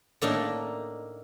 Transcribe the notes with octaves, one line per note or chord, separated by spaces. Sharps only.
A2 A#3 D4 D#4